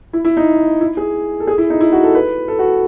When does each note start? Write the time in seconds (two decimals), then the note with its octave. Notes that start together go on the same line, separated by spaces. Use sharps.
0.13 E4
0.25 E4
0.37 D#4
0.81 E4
0.97 G#4
1.40 A4
1.47 G#4
1.58 E4
1.70 D#4
1.81 E4
1.92 F#4
2.03 A4
2.15 B4
2.48 A4
2.59 F#4